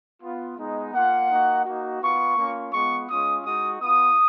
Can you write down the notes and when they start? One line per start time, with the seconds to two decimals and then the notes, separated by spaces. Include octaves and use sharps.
0.23 B3 F4
0.58 G#3 B3 D#4
0.94 A#3 F4 F#5
1.30 A#3 D#4 F#4
1.65 A#3 D#4 F#4
2.02 B3 F4 C#6
2.37 A#3 C#4 F4
2.73 G#3 B3 F4 C#6
3.09 G#3 C#4 F4 D#6
3.45 G#3 D#4 F#4 D#6
3.81 B3 F4 D#6